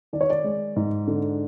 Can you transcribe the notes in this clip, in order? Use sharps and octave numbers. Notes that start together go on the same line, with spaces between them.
D#3 D5
C#5
D5
G#3
G#2
D3